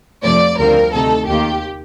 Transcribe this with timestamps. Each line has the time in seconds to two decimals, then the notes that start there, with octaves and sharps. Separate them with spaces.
0.23 F2 C3 F3 A3 D5
0.58 D2 D3 G3 C4 F4 A#4
0.92 D2 C3 D#3 A3 D#4 A4
1.27 D#2 D#3 A#3 F4 G4